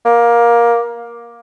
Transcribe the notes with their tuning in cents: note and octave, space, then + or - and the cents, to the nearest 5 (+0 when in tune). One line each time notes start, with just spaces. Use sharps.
A#3 +15